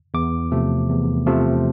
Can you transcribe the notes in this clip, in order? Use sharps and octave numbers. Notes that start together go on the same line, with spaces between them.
E2 D6
C3 F3 A3
E2
C3 F3 A3